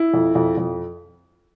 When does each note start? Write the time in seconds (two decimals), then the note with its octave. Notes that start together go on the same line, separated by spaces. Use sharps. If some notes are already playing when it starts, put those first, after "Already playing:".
Already playing: E4
0.14 F2
0.35 F2
0.57 F2